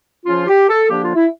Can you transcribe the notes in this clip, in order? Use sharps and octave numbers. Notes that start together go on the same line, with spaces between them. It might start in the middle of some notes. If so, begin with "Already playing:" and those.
C#3 F3 C#4 F4
G4
A4
D3 F3 A#3 D4 G4
F4
E4